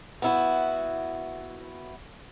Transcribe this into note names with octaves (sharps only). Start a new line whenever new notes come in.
B3 E4 F#4